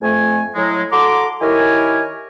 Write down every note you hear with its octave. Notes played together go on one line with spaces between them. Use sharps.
F2 A3 G#5
A2 F#3 G#3
F#4 A4 A#5 C6 D6
D#3 E4 G4 A#4 C#5 G#5